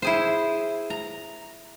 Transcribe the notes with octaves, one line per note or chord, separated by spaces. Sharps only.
E4 G#4 C5
A#5